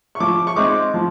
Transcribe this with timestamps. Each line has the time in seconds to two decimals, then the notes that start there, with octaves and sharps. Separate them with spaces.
0.15 C#6
0.20 F3 D6
0.47 C#6
0.56 G#3 C4 D#4 D6
0.94 F3